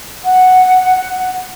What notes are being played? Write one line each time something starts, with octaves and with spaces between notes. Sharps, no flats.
F#5